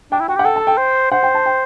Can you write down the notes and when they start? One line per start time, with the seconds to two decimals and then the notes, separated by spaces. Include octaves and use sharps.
0.12 D4 G5
0.20 E4
0.28 F#4 G5
0.36 G4 F#5
0.44 A4 G5
0.56 A5
0.67 G5
0.78 C5
1.11 C5 F#5
1.23 G5
1.35 A5
1.46 G5